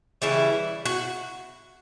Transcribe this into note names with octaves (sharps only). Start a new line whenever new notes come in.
C#3 E3 G3 E4
F#4